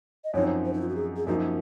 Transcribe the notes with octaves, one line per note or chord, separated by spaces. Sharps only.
D#5
F#2 F3 C4 D#4 C#5
C5
D#4
F4
F#4
G#4
G#4
F#2 F3 A#3 D#4 F#4